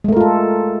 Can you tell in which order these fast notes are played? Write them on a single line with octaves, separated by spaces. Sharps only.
G#3 A3 A#4 F4 A4